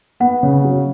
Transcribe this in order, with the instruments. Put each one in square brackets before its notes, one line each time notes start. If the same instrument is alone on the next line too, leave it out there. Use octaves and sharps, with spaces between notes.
[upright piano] B3 [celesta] F#5
[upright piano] C#3
F#3